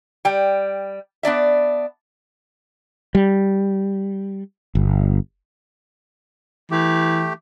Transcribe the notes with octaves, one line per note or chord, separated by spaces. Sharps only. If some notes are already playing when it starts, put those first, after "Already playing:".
G3 G5
B3 D4 D5 E5
G3
G1
E3 A3 G4